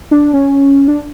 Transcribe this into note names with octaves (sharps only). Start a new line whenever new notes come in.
D4
C#4
D4